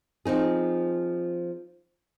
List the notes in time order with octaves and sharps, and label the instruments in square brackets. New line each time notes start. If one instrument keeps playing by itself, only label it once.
[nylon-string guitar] F3 C4 D#4 G#4